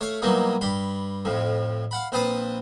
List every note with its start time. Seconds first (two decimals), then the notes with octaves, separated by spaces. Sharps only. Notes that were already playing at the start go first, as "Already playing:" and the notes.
0.01 A3 C#5 F5 C#6
0.22 B2 E3 F#3 G3 A#3 D#4
0.61 G2 G3 B5 C6
1.25 F2 A2 F3
1.91 F5 F#5 B5
2.12 A#1 C4 B4 C5 A5 D#6